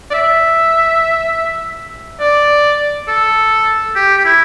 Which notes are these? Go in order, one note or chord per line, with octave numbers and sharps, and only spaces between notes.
D5
E5
D5
A4
G4
G4
E4